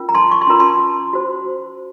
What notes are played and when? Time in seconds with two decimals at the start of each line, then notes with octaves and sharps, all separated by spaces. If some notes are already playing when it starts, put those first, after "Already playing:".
Already playing: C#4 F4 A#4
0.09 A#5
0.15 A5 C6
0.31 C#6
0.41 C6
0.47 C#4 F4 A#4 A#5
0.60 A5 C6
1.13 F#4 C5